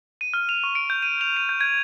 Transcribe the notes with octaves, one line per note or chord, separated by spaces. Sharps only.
D#7
F6
F7
C#6
D7
G6
D#7
F7
D#7
G6
G#6